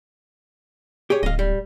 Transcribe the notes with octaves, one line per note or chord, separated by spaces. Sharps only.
G4 G#4 C#5
D1 D#5 F5
G3